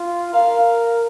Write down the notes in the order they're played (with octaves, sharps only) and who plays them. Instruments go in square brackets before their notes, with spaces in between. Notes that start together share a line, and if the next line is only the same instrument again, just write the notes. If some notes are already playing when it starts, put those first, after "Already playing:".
Already playing: [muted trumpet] F4
[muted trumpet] A#4 [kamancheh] F5